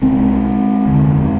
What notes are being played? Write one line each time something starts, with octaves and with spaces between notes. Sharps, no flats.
C2 C3 G#3 C4
F1 D#2 D3